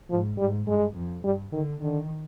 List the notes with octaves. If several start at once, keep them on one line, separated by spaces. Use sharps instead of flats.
G#2 F3
G#2 G3
G2 G#3
F2
G2 G3
D3 D#3
D3 D#3